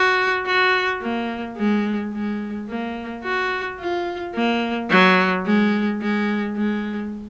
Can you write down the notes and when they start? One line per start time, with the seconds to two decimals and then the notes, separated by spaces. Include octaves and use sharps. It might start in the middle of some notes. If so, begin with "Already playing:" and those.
Already playing: F#4
0.47 F#4
1.02 A#3
1.57 G#3
2.13 G#3
2.69 A#3
3.24 F#4
3.80 F4
4.35 A#3
4.90 F#3
5.46 G#3
6.02 G#3
6.57 G#3